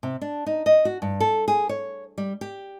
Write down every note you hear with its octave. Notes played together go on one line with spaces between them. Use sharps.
C3
D4
D#4
D#5
F#4
G2
A4
G#4
C#5
G3
G4